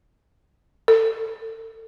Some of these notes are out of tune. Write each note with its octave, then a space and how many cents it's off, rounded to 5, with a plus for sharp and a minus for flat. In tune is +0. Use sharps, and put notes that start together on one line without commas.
A4 +35